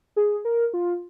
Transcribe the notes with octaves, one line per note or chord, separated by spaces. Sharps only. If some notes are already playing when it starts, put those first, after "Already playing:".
G#4
A#4
F4